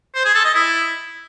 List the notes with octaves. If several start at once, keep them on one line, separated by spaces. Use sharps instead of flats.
C5
G#4
A4
D#5
E4